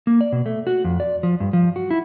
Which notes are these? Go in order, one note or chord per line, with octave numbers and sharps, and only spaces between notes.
A#3
D5
B2
A3
F#4
F2
D5
F3
G2
F3
F#4
E4